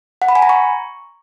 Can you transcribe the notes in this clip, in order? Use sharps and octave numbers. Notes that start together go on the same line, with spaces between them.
F#5
B5
G#5
A#5
C#6